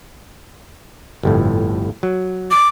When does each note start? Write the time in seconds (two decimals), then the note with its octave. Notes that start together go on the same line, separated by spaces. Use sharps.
1.23 G1 F2 A2
2.03 F#3
2.51 D6